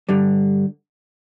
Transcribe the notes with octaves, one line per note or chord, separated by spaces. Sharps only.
G2 D3 G3